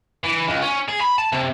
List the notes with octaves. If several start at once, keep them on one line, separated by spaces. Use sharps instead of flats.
E3
C#2
C#4
G#4
B5
A5
C3